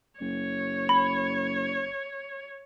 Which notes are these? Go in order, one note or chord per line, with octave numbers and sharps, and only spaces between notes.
F#1 C#5
B5